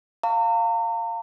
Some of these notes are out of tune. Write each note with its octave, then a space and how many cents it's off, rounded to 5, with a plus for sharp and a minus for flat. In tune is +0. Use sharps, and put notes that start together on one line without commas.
F5 +0 A#5 -40 C#6 +25